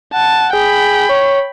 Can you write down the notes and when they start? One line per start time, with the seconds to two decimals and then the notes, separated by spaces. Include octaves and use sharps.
0.13 F#5 A5
0.53 G#4 G5 B5
1.09 C#5